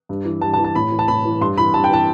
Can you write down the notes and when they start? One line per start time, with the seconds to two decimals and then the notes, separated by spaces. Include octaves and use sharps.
0.09 G2
0.25 E3
0.41 G2 A5
0.54 A5
0.58 E3
0.64 A5
0.75 A2 B5
0.92 E3
0.99 A5
1.08 A2 B5
1.25 E3
1.41 G2 C6
1.58 E3 B5
1.74 G2 A5
1.84 G5
1.90 E3 A5